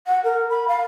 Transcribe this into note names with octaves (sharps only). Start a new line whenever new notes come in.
F#5
A#4
B5
F5